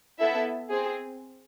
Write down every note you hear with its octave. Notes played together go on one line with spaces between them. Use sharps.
B3 E4 A4 E5
C4 G#4